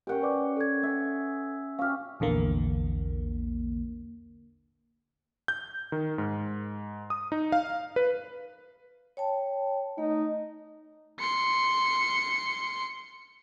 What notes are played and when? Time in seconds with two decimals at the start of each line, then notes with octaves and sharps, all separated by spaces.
0.07 C#4 G4 A#4 F#5 G5
0.22 B4 D5 D6
0.57 A4 G#6
0.83 G#4 E5
1.79 C#4 G4 F5 F6
2.20 A#1 E2 D3 A#3
5.48 G6
5.92 D#3
6.18 G#2
7.10 D#6
7.32 D#4
7.52 F5
7.96 B4
9.17 C#5 G5 A5
9.98 A3 D#4
11.20 C6 C#7